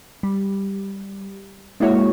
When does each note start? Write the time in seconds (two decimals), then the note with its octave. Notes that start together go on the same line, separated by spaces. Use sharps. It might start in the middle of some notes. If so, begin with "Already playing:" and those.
0.23 G3
1.80 G#3 A#3 E4 F#4 C#5